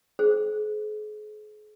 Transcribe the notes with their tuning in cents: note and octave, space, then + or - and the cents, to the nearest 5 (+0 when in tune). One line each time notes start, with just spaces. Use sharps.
G#4 +40 C5 +0